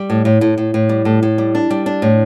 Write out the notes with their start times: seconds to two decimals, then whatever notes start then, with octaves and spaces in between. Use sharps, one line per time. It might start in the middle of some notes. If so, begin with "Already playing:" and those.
Already playing: G3
0.10 A2
0.25 A2
0.41 A2
0.58 A2
0.74 A2
0.89 G3
1.05 A2
1.23 A2
1.38 G3
1.55 D4
1.70 G3
1.86 D4
2.02 A2